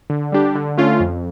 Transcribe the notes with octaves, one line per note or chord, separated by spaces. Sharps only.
D3
G3 D4 G4
D3
A3 C#4 F4
F2